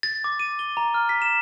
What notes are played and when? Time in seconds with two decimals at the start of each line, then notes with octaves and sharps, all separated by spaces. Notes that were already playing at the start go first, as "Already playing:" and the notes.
0.03 A6
0.24 D6
0.39 D#7
0.59 G7
0.77 A#5
0.94 F6
1.09 B6
1.22 E7